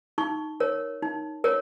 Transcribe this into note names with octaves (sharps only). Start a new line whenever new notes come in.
D#4 C#6
A#4 C#5
D#4
A#4 C#5